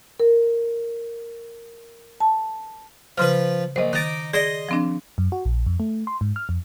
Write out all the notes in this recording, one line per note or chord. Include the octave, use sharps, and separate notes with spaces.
A#4
A5
C#3 F3 B4 C6 F6
A#1 C5 D#5
D#3 D#4 D6 A6
G#4 D5 D#5 C6
F3 C4 D4
F#2
F#4
A#1
F2
A3
C6
G#2
F6
F2